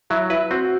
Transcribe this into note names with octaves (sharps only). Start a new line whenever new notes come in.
F#3 E4
E4 B4
C4 F#4